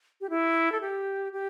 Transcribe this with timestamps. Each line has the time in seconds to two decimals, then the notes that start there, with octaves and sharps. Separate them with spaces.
0.21 G4
0.30 E4
0.72 A4
0.81 G4
1.33 G4